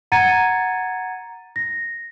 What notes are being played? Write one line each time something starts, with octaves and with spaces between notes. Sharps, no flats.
F#5 A#5 G#6 A6 C#7 D#7
A#6